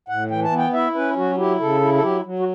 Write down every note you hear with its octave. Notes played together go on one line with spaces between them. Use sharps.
A2 F#5
E3 G5
A5
B3
G5
E4 E5
C#4 B4
F#3 F#4
E4 G4
C#3 A4
E4
A4
F#3 G4
F#3
F#4